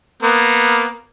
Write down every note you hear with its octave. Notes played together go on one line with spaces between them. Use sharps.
A#3 B3